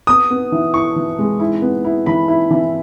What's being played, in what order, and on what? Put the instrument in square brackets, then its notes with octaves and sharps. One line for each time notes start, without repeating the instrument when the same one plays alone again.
[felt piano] B3 [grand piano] D#6
[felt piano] B3
E3
[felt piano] E4 [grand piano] C#6
[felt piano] E3
G#3
E4
B3
E4
[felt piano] E3 [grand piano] B5
[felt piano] E4
E3